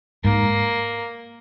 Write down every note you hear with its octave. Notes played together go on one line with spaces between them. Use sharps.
G#2 A#3